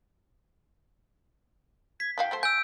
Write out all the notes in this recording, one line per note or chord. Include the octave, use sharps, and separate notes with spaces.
G#6 B6
D#3 F#4 F5 G5
F#3 A3 C5
G#5 E6 G6 D7